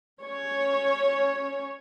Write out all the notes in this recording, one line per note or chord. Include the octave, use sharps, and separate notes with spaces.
C#4 C#5